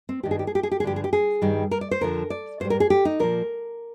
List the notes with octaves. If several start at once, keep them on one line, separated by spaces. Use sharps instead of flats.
C4
G2 D#3 G3 G4
G#4
G4
G#4
G4
G#4
G4
G#4
G2 D3 F3 G4
G#4
G4
G#4
G2 D#3 G3
A#4
D5
C5
F2 D3 F3 A#4
D5
G#2 G3 C5
A#4
G#4
G4
D#4
A#2 F3 A#4